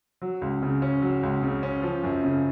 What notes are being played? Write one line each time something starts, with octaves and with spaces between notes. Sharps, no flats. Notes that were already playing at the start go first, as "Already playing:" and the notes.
F#3
C#2
C#3
C#4
F#3
C#2
C#3
C#4
F3
F#2
C#3